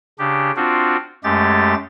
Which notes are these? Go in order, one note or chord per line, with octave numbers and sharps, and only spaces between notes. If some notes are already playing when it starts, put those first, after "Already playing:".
C#3 D4 G4
C4 D4 F4 F#4
F#2 G#3 A3 G4 A6